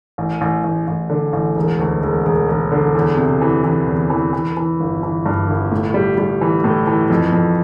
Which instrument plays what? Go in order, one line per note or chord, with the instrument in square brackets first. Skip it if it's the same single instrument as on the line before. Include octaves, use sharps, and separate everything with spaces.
[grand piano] A1
A1
A1
A1
D3
A1
E1
D2
E1
E1
E1
D3
E2
C3
E3
E3
E2
E3
E3
E3
G1
E3
G2
G1
A2
G3
G3
E3
A2
E3
F2
F2